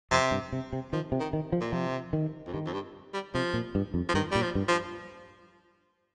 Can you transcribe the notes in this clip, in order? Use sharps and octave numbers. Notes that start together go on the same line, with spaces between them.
F2 C3
G2
C3
C3
D#3 F3
C3
D#3
D#3
F3
A#2
C3 F3
D#3
F2
G2 D#3
F2
G2
G3
C3 F3
A#2
G2
F2
F3
G2 D#3
A#2 G3
F3
G2
F3